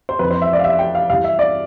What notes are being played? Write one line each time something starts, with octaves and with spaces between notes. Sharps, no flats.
C5
F2 E3 B4
C5
E5
D5
F5
E5
G5
F5
G2 E3 F5
E5
D5